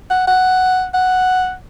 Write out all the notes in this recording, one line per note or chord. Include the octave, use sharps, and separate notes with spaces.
F#5
F#5
F#5